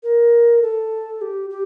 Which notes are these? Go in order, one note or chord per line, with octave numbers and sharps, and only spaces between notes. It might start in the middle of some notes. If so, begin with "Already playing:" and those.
A#4
A4
G4
G4